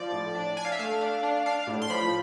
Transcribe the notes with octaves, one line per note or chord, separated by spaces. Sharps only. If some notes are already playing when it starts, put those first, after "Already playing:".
Already playing: F3 D5
A2
D4
D4 G#5
F5
E5
A3 F5
D4
D4
D4 F5
A2
C6
F3 B5